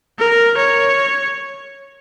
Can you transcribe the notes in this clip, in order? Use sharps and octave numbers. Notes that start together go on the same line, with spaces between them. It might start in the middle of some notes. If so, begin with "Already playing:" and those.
A#4
C#5